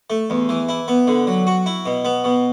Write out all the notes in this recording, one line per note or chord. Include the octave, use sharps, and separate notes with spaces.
A3
E2
E3
E4
B3
D3
F#3
F#4
E4
B2
B3
B2